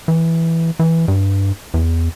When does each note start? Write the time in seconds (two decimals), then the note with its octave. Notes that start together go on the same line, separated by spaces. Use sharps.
0.08 E3
0.79 E3
1.08 G2
1.74 E2